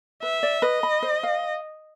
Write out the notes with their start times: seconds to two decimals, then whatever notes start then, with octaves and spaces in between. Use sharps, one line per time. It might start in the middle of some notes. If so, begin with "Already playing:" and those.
0.23 B4 E5
0.43 D5
0.62 B4 D#5
0.83 B5
1.02 C5
1.23 F5